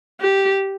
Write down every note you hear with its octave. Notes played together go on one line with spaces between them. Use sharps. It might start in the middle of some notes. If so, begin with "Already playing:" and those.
G4